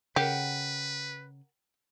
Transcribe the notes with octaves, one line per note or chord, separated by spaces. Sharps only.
C#3 G4 A#4 B4 F#5